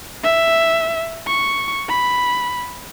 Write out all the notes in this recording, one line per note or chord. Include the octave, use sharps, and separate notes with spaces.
E5
C#6
B5